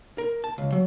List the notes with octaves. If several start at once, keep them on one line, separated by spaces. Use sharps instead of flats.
A#4
A5
C#2
F#3